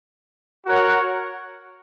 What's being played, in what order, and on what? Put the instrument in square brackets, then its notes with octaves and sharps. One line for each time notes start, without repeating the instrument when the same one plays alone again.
[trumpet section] F#4 A#4 C#5 F#5